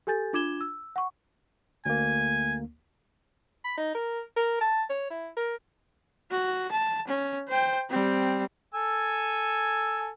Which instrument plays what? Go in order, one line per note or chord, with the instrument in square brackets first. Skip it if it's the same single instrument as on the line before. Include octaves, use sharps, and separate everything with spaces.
[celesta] G4 A4 G#5 G6 A6
D4 F4 D6 G#6 E7 G7
E6
F#5 C#6
[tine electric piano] D2 A#3 [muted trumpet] G#5
[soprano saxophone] B5
D#4
A#4
A#4
A5
C#5
E4
A#4
[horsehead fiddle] F#4
A5
C#4
C5 G5
G3 C4
[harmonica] A4 G#5 E6